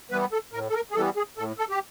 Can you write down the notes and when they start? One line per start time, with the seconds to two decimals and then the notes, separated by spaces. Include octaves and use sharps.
0.11 E3 G3 B3 B4
0.32 A4
0.53 A2 A#4
0.70 A4
0.74 A#4
0.91 G#4
0.95 E3 G3 B3 A4
1.16 G#4
1.37 A2 A4
1.58 A4
1.70 G4